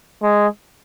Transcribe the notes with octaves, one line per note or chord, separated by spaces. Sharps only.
G#3